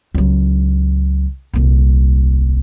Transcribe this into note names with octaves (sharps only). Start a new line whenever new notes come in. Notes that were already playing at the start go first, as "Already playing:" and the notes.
C#2 F#3
D#1 C2